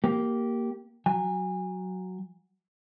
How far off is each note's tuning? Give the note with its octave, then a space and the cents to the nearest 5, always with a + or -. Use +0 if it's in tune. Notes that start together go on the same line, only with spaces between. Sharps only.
A#3 +0 G4 -15
F#3 +0 G#5 -25